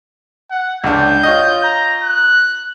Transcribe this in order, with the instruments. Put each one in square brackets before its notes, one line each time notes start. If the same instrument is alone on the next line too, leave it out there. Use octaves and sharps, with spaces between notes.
[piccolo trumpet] F#5
[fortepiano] C#2 D4 [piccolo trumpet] G6
[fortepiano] F4 C#5 D#5
[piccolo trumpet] A#5
F#6